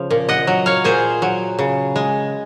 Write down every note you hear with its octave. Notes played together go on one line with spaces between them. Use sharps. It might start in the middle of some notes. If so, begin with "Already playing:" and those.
Already playing: C#3 F3
A#2
D#5 F#5
F#3
C#5 F5
A#2 G#4 C5
F#3
C#3
G#3